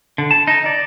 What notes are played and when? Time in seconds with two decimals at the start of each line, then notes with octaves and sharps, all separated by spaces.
0.18 D3
0.31 A5
0.47 D#4
0.66 D5